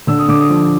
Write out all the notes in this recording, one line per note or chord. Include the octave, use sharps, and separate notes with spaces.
D3 E6
D#6
D3 D6
D#6
F3